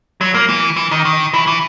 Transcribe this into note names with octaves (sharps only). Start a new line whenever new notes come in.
F#3
A#3
E3
E3
D#3
D#3
E3
E3